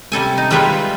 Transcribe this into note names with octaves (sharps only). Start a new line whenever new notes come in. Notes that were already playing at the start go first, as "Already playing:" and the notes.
C3 G3 A4 G#5
D#4
G3 G#3 F4 B4 C#5 E5